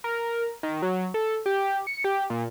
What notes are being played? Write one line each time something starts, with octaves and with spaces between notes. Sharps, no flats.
A#4
D#3
F#3
A4
G4
C#7
G4
A#2